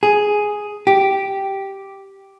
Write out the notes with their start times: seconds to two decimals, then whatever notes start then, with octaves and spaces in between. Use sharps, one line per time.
0.03 G#4
0.87 G4